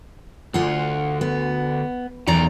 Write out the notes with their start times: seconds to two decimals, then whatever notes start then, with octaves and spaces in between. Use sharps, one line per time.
0.54 D2 F4 F#5
1.21 B3
2.27 B1 E2 D#3 D5 A#5